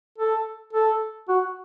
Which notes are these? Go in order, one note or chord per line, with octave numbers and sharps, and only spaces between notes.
A4
A4
F#4